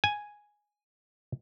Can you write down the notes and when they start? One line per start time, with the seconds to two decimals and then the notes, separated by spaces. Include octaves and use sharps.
0.04 G#5